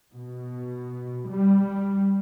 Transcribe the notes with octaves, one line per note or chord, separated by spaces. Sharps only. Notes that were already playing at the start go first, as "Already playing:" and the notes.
B2
G3